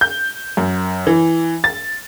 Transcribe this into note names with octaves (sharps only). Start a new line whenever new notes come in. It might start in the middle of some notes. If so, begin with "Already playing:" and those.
G6
F#2
E3
A6